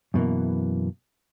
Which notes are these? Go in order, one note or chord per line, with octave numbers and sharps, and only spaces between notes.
F#2 B2 E3 A#3